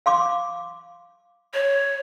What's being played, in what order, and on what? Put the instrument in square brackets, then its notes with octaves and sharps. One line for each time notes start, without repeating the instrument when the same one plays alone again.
[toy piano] F5 C6 D6
[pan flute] C#5